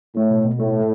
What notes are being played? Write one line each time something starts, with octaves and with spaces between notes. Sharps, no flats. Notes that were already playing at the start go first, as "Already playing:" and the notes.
A2 A3
B2
B2
A2 A3